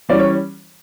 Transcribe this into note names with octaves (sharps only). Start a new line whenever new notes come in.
E3 G3 C#4 D5
C#5